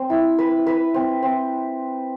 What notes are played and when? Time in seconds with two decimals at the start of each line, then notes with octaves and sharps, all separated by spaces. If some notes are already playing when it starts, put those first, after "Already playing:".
Already playing: C4
0.10 E4
0.38 B4
0.67 B4
0.94 C4
1.23 C4